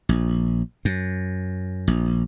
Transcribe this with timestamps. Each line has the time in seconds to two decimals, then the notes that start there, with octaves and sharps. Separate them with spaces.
0.09 A#1
0.85 F#2
1.88 A#1